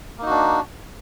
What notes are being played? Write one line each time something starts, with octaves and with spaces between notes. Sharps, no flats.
A#3 D4 D#4 F#4